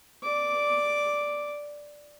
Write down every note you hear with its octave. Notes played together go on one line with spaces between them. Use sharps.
D5 D6